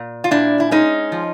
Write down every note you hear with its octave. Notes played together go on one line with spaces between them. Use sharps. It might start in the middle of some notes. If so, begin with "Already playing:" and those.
Already playing: A#2
F4
A#2 D4 E4
E4
G#3 C#4 D#4
F3